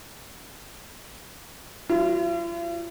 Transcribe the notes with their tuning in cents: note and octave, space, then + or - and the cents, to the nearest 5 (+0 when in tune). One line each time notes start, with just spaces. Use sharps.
F#3 +0 F4 -45